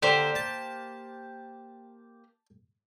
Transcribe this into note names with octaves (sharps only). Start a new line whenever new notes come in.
D3 A#3 G4 C5
A5